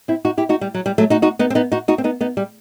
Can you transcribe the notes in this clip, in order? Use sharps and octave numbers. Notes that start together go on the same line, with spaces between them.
C4 E4
D#4 F#4
E4 G4
D#4 F#4
G3
F#3
G3
F#3 A3
D#4 F#4
D#4 F#4
B3 D#4
C4
B3 D#4
D#4 F#4
D#4 F#4
C4
B3 D#4
B3 D#4
G3